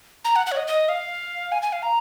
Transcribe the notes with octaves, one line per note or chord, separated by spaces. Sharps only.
A#5
F#5
F#5
C#5
D#5
D#5
F5
G#5
G#5
F5
A#5